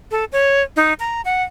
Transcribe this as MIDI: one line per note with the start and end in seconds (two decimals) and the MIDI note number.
0.11 0.25 69
0.32 0.63 73
0.76 0.93 63
1.00 1.21 82
1.25 1.43 78